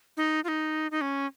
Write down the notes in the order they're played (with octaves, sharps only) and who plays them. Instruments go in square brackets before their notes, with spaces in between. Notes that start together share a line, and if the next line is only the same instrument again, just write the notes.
[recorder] D#4
F4
D#4
D#4
C#4